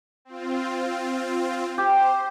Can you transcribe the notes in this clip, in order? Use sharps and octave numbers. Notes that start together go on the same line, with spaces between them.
C4 F4
G4 C5